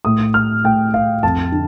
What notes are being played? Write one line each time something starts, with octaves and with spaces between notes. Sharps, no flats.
A2 D#6
F6
A2 G5
F5
F2 A5
D3